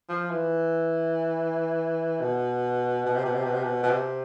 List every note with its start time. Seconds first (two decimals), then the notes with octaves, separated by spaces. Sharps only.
0.09 F3
0.30 E3
2.21 B2
3.06 B2
3.16 C3
3.25 B2
3.34 C3
3.44 B2
3.54 C3
3.63 B2
3.83 B2
3.89 C3